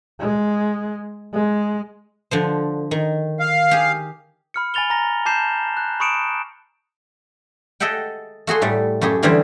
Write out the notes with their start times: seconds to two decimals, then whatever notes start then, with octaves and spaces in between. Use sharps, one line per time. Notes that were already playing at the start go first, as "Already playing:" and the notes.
0.20 G#3
1.34 G#3
2.31 D3 F3 C5
2.91 D#3
3.40 F5
3.71 G4 G#4
4.54 B5 F6 C#7
4.74 G#5 B5 A6 F7 G7
4.90 A#5 A#6
5.26 A5 D6 G6 C7 E7
5.77 F#6
6.00 B5 C#6 D#6 C#7 D7 E7
7.80 G#4 A4 D#5 E5 F#5 G5
8.47 A3 F#4 G#4 C6
8.61 A2 G3 A3
9.01 F#2 A3 G4 G#4
9.23 D3 E3 G3 C#4 G#4 C5